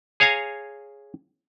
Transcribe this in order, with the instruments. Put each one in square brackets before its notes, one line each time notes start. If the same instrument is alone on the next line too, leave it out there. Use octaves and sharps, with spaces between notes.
[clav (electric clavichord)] G#4 C#5 F5 G#5 A#5